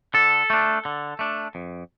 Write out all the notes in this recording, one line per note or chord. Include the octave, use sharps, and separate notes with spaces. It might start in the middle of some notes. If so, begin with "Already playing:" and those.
D3 A4
A3 D4
D3
A3 D4
F2